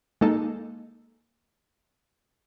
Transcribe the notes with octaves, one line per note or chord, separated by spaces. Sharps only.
G#3 A#3 D#4 A4